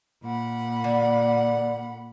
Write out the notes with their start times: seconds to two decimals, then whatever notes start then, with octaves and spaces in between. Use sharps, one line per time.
0.24 A#2 F#5 B5
0.84 D3